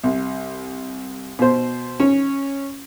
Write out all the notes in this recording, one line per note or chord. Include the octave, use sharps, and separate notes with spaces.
C2
B2 C5
C#4